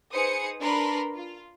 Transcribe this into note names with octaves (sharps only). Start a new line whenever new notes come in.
D#4 G#4 B4 C5 D#6 C#7
D4 A#4 B4 A5 B5 C6
F4